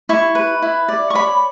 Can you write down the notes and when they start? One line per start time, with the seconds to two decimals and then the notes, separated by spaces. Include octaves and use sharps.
0.09 E4 C#6
0.35 B4
0.62 E4
0.88 D5
1.10 C#6
1.15 C#5 B5